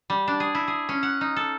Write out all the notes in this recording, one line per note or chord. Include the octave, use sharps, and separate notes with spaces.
G3
D4
G#4
E4
G#4
C#4
F#5
D#4
A4